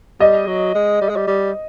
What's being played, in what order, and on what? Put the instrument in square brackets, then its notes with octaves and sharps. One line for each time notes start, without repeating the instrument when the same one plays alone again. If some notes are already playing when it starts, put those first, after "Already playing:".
[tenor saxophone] G3 [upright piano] D#5
[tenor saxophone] F#3
G#3
G3
G#3
G3
G3